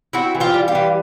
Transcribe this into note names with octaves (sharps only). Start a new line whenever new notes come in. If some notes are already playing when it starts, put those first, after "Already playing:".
C4 E4 F#4
E3
F4 G4
G3
F4 G4
E3